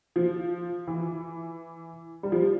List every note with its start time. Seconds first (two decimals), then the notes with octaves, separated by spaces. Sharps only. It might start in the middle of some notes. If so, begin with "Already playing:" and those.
0.16 F3
0.87 E3
2.23 G3
2.32 F3